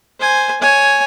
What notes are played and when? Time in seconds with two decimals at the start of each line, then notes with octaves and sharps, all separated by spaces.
0.20 C5 G#5
0.61 C#5 G#5